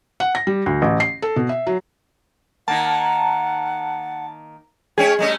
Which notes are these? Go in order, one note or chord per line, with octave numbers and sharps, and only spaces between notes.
F#5
A#6
G3
D2
A1
C7
A4
B2
E5
F#3
D#3 A#3 F#5 A5
G#3 C#4 G#4 C#5 G5
G3 A3 C#4 D#5